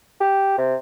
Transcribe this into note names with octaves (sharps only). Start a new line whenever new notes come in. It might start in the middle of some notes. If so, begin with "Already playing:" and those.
G4
C3